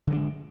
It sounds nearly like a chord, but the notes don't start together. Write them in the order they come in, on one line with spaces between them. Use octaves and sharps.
D3 F#3 D4 G#3